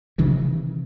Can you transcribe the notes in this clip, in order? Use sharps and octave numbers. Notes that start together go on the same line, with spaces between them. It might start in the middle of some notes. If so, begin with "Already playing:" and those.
C3 D#3 E3